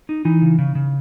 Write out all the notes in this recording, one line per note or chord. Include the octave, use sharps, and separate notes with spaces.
D#4
E3 D#4
C#3
C#3
C#3